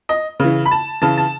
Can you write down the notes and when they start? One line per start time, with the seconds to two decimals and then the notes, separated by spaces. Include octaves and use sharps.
0.09 D#5
0.40 C#3 E3
0.65 B5
0.71 A5
1.02 C#3 E3 A5
1.18 A5